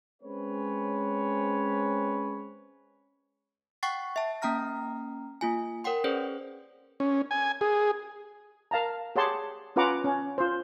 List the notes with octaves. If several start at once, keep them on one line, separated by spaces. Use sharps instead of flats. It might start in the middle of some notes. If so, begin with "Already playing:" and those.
G#3 C4 C#4 B4 C#5
F#5 G5 C#6 F#6 A6 C7
E5 A5
A#3 C#4 G5 A#5 F6 A#6
A#3 F4 G#5
A#4 C#5 F#5 G5 C6
C#4 G#4 B4 C5 D5
C#4
G#5
G#4
A#4 F5 A5 A#5
G4 G#4 C#5 F#5 A5 C6
C#4 F4 B4 F#5 A#5 D6
C#4
F4 C5